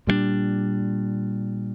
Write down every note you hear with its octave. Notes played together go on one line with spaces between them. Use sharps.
A#2 G3 A#3 D4